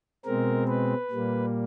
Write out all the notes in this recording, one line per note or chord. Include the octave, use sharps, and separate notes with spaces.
B2 G#3 C4 A#4
B4
A#2 G3 A#3